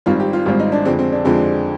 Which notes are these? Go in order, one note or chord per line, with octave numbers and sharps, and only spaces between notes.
G#1 G#2 G3 C4 F4
G4
F4
G#1 G#2 G3 C4 F4
D#4
D4
F2 D3 G#3 C4
C4
D4
F2 D3 G#3 C4